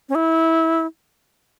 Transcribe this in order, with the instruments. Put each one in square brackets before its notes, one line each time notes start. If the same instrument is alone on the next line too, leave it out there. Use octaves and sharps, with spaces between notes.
[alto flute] C#4
E4